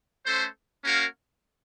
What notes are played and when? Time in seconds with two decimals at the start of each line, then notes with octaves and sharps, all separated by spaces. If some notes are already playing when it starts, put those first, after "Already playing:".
0.25 A3 C#4 A4 C5
0.84 A#3 C#4 F#4 A#4 F5